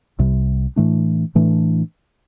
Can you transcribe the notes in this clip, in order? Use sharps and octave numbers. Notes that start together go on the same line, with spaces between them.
C2 C3 G3
A2 E3 A3 D4
A2 E3 A3 D4